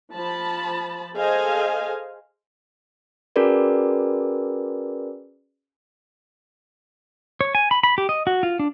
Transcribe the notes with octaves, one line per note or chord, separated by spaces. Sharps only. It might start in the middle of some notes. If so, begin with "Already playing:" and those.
F3 A5 B5
G#4 A4 C5 D#5 F5 G#5
C#4 F#4 G#4 A#4 B4 D5
C#5
G#5
B5
B5
G4
D#5
F#4
F4
D4